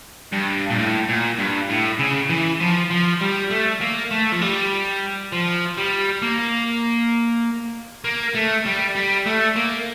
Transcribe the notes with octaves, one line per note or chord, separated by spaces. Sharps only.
G2
A#2
A2
A#2
G2
A2
C#3
E3
F3
F3
G3
A3
A#3
A3
F3
G3
F3
G3
A#3
A#3
A3
G3
G3
A3
A#3